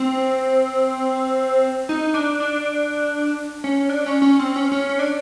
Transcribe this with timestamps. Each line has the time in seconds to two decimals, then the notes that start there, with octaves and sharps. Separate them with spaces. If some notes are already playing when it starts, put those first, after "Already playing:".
Already playing: C4
1.89 D#4
2.14 D4
2.40 D4
3.64 C#4
3.89 D4
4.06 C#4
4.22 C#4
4.39 C4
4.56 C#4
4.72 C#4
4.89 C#4
4.99 D4